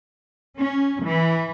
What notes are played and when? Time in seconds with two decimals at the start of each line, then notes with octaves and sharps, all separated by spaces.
0.57 C#4
1.03 E3